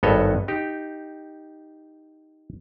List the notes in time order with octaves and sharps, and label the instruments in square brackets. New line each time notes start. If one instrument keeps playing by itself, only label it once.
[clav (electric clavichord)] G#1 G2 B3 A4 C#5 D#5
D#4 G4